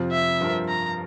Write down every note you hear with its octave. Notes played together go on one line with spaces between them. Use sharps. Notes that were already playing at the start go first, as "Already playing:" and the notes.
Already playing: F2 C3 F3 C4 F4
E5
G2 F3 C4 F4 A#4
A#5